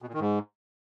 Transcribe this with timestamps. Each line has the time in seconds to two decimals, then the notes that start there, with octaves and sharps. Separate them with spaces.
0.02 B2
0.08 A#2
0.14 D#3
0.20 G#2